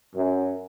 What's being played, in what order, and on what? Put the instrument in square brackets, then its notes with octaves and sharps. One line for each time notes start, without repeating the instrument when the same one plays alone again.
[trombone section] F#2